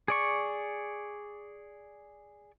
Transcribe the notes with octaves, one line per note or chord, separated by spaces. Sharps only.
G#4 D5 C#6